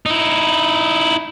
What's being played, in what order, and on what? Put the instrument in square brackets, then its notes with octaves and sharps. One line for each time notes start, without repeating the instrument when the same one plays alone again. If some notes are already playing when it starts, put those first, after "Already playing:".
[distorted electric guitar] D#4 E4